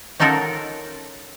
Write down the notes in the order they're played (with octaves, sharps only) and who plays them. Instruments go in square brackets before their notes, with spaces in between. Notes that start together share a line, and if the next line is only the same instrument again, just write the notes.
[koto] C#4 D#4 F4 A4 A#4 F#5